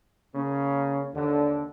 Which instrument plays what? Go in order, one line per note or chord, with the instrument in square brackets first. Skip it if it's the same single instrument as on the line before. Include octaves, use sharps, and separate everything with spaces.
[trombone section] C#3 A#3 C#4
D#2 D3